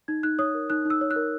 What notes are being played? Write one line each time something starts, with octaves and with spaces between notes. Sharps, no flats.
D#4 G#6
D#4 F#6
C#5 D#6
A#4
D#4 F#6
D#4
E6
C#5
F#6
A#4